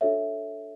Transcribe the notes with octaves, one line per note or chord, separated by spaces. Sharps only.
D4 F#4 A4 C#5 E5